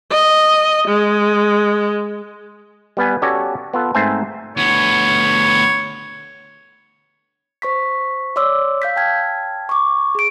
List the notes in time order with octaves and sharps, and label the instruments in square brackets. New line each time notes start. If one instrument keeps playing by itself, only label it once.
[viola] D#5
G#3
[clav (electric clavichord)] G3 B3 B4 G#5
C#4 F#4 G4 A4 D5 G#5
B3 F4 A4
G#2 A3 C4 C5 G#5
[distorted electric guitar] D2 B3 [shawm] C#5
[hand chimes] C5 C#6 B6
C#5 D5 C6 D6 E6
F5 G6 B6
G5 A5 F6 G#6
C#6 D6
G#4 D7